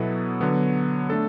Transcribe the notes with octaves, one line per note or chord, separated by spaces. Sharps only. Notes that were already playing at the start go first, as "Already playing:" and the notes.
Already playing: B2 F#3 B3 E4 A4
D3 F#3 B3
A3 D4 A4